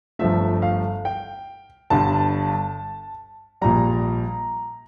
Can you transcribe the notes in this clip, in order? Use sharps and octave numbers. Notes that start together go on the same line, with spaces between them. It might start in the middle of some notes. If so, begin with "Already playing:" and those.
G1 G2 F3 A3 E5
F5
G5
G1 G2 D3 G3 A5
A#1 A#2 G3 A#5